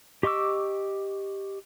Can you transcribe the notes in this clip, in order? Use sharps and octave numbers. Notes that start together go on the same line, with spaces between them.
G4 D#5 C#6 D6 E6